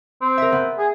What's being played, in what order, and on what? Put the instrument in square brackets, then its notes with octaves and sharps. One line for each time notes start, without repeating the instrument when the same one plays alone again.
[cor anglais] C4
[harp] A#4 E5
B3
[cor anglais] G#4